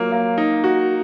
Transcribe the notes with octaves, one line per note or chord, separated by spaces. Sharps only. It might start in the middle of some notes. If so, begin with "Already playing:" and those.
Already playing: F#3 A#3 F4
A#3
D#4
F#4